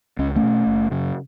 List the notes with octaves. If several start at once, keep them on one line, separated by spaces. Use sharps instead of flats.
C#2 C#4
A3 C#4
B2
F#1
F#2 C#3